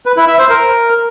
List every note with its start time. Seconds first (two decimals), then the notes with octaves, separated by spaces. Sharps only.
0.06 B4
0.17 E4
0.28 E5
0.39 C5
0.50 A#4